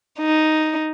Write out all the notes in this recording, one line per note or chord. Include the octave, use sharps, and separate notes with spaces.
D#4